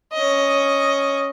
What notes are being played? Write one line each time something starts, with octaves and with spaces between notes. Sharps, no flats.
C#4 D#5